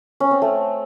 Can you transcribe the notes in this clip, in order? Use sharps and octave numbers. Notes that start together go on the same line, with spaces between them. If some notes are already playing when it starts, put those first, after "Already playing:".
C#4
C4
A3